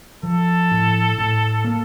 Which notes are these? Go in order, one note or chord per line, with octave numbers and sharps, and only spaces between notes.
F3 A4
A2
A2
A#3